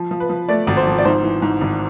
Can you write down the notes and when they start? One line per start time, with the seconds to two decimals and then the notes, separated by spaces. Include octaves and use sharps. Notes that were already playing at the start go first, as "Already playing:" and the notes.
Already playing: F3
0.11 F3
0.20 B4
0.29 F3
0.49 A3 D5
0.67 G#1
0.77 C5
0.87 F3
0.98 D5
1.05 G#2 C5
1.23 E3
1.42 G#2
1.61 G#1